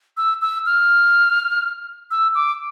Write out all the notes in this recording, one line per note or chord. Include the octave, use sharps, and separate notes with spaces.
E6
E6
F6
E6
D6